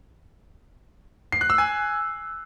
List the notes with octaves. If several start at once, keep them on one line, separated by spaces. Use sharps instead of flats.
C7
F#6
E6
G#5